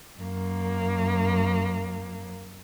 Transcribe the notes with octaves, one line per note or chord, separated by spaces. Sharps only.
F#2 A#3